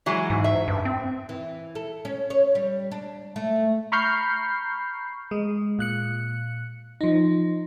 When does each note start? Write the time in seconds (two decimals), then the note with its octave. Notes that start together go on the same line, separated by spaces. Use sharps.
0.06 E3 F#3 G#3
0.30 G#2
0.44 E5
0.68 G2
0.85 C4
1.29 E3
1.75 A4
2.05 C#4
2.30 C#5
2.55 G3
2.92 D4
3.36 A3
3.92 A#5 B5 C#6 F6 G6 C7
5.31 G#3
5.79 A#2 F#6 C#7
7.01 F3 D#4